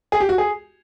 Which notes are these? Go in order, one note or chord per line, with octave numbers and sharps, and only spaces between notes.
G#4
G4
F#4
G#4